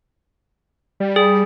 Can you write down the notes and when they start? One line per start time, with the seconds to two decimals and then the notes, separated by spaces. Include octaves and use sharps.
1.00 G3
1.16 G#4